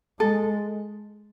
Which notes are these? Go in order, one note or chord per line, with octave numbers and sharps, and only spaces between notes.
G#3 A4